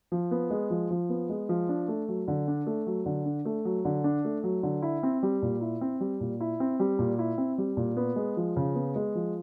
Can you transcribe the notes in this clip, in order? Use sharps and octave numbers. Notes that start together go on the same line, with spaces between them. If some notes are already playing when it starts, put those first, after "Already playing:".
F3
B3
G#3
F3
F3
B3
G#3
F3
D4
A3
F#3
D3
D4
A3
F#3
D3
D4
A3
F#3
D3
D4
A3
F#3
D3
E4
C4
G3
A#2
E4
C4
G3
A#2
E4
C4
G3
A#2
E4
C4
G3
A#2
B3
G#3
F3
C#3
B3
G#3
F3